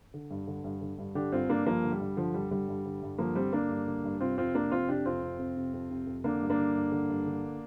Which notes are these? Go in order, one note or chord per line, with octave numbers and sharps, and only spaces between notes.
D3
G2
D3
G2
D3
G2
D3 D4 G4
G2 C4 F4
D3 A#3 D4
G2 F3 A#3
D3
G3
G2
D3 F3
G2 G3
D3 G3
G2
D3
G2
D3 F3 A#3
G2 G3 C4
D3 A#3 D4
G2
D3
G2
C3 C4 F4
F2 C4 F4
C3 A#3 D4
F2 C4 F4
C3 D4 G4
F2 C4 F4
C3
F2
C3
F2
C3
F2
D3 A#3 D4
G2
A#3 D4
D3
G2
D3
G2
D3